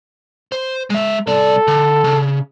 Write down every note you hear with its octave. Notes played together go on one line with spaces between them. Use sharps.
C5
G#3 E5
C2 A4 D5
D3
C#3